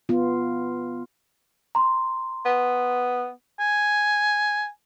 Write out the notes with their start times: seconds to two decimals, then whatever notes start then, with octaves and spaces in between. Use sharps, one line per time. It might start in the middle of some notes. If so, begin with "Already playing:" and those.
0.09 B3 F4
1.75 A#5 C6
2.45 B3
3.60 G#5